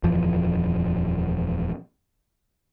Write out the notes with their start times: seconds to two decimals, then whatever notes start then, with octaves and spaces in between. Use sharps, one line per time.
0.03 D#1 F2 E3 F3